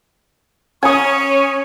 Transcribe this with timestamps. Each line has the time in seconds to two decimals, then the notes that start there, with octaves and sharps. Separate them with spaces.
0.83 C#4 G#5 C#6 D#6